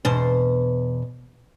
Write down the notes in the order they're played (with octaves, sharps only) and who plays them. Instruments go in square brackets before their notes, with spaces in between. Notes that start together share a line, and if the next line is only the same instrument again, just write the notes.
[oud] E2 B2 C5